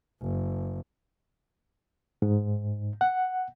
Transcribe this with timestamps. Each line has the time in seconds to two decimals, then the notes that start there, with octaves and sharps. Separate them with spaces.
0.21 F#1
2.22 G#2
3.01 F#5